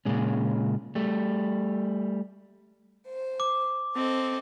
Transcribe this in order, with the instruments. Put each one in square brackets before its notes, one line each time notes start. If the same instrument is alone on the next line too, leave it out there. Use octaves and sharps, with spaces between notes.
[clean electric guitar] A#2 C#3 G#3 C#4
G3 A3
[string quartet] C5
[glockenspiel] D6
[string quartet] C4 A4 D#5